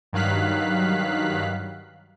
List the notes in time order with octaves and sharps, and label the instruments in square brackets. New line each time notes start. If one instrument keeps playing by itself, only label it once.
[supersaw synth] G2 D#3 F#3 F5 F#6 B6